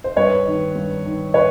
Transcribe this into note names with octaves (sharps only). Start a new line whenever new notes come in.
C5
G2 B4 C#5
D#3
G2
D#3
B4 C#5